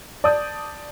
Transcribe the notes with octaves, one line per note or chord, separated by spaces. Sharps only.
D5 A5 D#6 G6